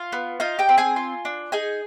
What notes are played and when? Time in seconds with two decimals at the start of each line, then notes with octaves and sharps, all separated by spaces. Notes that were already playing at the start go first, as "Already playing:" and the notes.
Already playing: F4 F5
0.12 B3
0.40 D#4 F4 F5
0.59 G4 G5
0.69 C4
0.78 G#4 G#5
0.96 F4
1.25 D4
1.52 D#4 G#4 G#5